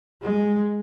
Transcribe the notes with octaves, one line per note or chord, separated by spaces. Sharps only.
G#3